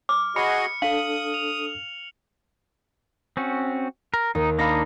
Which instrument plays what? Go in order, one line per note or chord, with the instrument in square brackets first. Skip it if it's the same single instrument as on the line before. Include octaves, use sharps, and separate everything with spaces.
[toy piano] D6 [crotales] F6
[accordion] F#4 G#4 D#5 [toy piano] B5 [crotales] C#7
[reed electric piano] D4 A4 [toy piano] F5 [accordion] D#6 [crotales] F#7
[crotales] F7
[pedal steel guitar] C4 C#4 F#4
A#4
[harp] D#2 [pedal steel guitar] D#4
[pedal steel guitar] A#3 D4 D#4 [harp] F5 B5 A#6